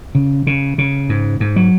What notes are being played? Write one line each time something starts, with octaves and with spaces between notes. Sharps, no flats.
C#3
C#3
C#3
G#2
G#2
F#3